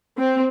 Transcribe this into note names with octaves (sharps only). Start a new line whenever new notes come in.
C4